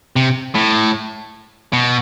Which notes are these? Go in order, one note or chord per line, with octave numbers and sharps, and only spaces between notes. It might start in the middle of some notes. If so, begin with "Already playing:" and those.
C3
A2
B2